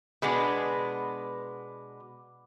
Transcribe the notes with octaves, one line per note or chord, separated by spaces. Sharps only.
B2 G#3 B3 D4